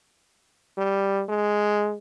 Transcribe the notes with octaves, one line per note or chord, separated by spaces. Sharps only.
G3
G#3